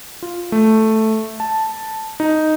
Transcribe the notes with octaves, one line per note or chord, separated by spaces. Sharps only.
F4
A3
A5
D#4